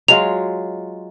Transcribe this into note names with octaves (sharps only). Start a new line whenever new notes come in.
F#3 G#3 F4 F7